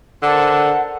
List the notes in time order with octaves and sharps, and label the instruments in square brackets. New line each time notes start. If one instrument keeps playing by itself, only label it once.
[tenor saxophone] D3 [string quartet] A#4 C5 A5 [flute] F#5